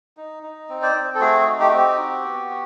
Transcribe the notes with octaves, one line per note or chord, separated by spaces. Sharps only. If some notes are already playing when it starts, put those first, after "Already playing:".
D#4
D#4
C4
C5 D5
C4
A4
A3 F#4 G#4
D#4
G4
F#4
C4 G4
F#4
B3
F#4